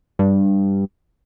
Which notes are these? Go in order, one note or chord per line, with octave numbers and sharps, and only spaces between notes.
G2